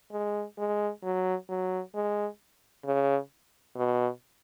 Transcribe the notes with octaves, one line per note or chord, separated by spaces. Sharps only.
G#3
G#3
F#3
F#3
G#3
C#3
B2